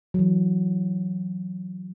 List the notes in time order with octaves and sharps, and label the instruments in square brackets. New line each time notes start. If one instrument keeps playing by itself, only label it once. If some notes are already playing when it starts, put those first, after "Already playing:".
[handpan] E3 F#3